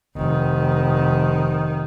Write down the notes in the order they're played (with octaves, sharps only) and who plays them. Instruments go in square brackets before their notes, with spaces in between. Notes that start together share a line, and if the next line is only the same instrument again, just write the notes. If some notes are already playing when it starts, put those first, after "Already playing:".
[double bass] F1 D#3